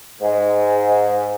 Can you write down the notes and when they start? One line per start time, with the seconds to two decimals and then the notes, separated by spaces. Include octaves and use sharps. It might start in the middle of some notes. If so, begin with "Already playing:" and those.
0.21 G#2